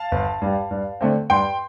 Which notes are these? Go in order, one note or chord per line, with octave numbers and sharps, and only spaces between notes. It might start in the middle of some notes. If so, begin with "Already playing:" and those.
Already playing: F5 A5
G1
G2 G3
G2
D3 A3 C4
G2 G5 C6